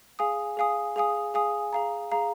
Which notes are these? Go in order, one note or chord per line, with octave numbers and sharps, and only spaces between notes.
G#4 F5 G#5 D#6
G#4 F5 G#5 D#6
G#4 F5 G#5 D#6
G#4 F5 G#5 D#6
G#4 F5 A#5
G#4 F5 A#5